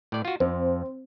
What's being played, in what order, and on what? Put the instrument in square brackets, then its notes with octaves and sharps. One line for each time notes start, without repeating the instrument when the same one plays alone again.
[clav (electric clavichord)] A2 D5
F4 F#4
[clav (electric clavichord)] F2 [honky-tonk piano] C4